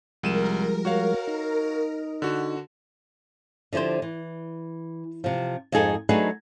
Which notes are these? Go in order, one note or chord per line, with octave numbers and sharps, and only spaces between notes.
C2 F3 G3 G#3 A#4 D#7 E7
F#4 C#5 F5
D#4
D3 F#4
D3 F3 E4 G4 C5
E3
C3 F3
F2 G#2 D#4 G#4 A4
F#3 A3 D4 D#4 G#4 B4